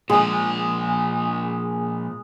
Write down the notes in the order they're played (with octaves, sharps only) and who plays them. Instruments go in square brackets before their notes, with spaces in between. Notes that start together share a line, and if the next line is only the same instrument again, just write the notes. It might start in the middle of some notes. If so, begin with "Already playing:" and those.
[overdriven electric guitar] A#2 F3 [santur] G#3